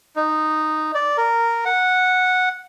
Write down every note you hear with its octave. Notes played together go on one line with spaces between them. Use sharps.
D#4
D5
A#4
F#5